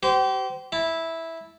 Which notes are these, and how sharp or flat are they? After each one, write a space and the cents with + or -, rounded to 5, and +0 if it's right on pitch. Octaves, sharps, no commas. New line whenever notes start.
G4 -40 C5 -25
E4 -10 A5 +0